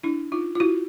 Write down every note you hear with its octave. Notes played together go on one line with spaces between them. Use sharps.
D4 E4
D#4 F4
F4
E4 F#4